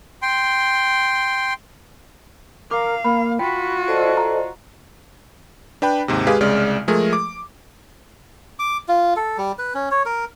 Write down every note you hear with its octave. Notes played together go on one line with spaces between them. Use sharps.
G5 C6
A#4 F5 D6
A#3 B5
F4 F#4 G5 B5
A4 C5 D5 D#5
A#5
D4 B4 G5 B5
D#2 G#2 C3
G#3 G4 G#4 B4 F5
C2 C#3 G#3 D5 F6
F3 G#3 A3 G#4 A#4
D6
D6
F4
A4
G3
B4
C#4
C#5
A#4